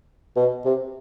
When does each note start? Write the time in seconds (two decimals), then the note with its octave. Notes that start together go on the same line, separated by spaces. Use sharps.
0.36 B2
0.65 C3